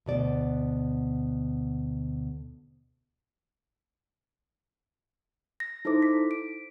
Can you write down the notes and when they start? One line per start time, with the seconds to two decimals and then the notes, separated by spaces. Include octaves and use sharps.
0.06 D2 B2 D5
5.60 A#6
5.85 D#4 E4 A4 C5 D6
6.02 B6
6.31 D7